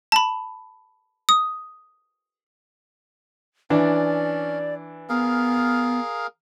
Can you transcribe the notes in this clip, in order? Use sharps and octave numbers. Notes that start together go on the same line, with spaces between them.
A5 B5
D#6
E3 C#4 D4 D5
B3 G#4 A#4 F5